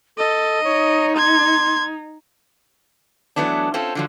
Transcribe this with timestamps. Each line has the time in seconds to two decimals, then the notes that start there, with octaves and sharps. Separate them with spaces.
0.17 A4 D#5
0.64 D#4 C#5
1.17 C6 G#6
3.36 E3 F#3 A3 B3 D4
3.74 C4 C#4 F4 A4
3.95 D3 F3 F#3